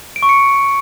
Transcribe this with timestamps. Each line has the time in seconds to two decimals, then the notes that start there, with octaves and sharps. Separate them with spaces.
0.16 D7
0.23 C#6
0.29 C#7